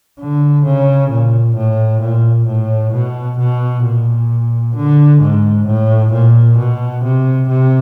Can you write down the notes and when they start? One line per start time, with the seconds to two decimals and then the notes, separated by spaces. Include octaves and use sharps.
0.20 D3
0.65 C#3
1.11 A#2
1.56 A2
2.01 A#2
2.48 A2
2.93 B2
3.39 B2
3.85 A#2
4.76 D3
5.21 G#2
5.66 A2
6.12 A#2
6.58 B2
7.04 C3
7.49 C3